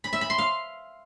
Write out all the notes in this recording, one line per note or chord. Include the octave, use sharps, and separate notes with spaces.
B5
E5
B5
C6
F5